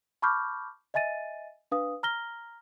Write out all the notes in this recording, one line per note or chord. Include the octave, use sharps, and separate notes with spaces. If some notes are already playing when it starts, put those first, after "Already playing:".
A5 B5 C#6 D6 F6 G6
D#5 E5 G#5 A6 D#7
D4 B4 F5 D#6
A#5 F6 A#6 G7